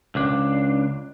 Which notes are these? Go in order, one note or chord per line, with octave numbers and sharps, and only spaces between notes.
C#2 D4